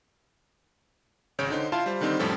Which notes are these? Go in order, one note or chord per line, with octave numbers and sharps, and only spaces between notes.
G#1 C#3 C#5 G6 D7
D3 D#4 C5
E4 F4 F5 A5 C6
G3 C5
D3 D#3 G3 C4 D#4
F2 A2 F3 G3 C#4 A4